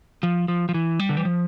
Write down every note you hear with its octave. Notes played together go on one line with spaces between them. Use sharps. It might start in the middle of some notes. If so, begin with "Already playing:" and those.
F3
F3
F3
E3
G3
D3
E3
F3